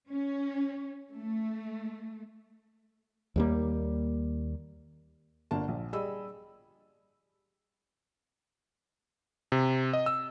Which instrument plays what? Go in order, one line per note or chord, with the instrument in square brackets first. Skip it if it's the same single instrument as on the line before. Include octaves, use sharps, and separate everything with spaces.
[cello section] C#4
A3
[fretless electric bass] D#2 G3 A#3
[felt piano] G1 D3 A#3 A5
A#1
G3 G#4 D#5 B5 E6
[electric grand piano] C3
D#5
E6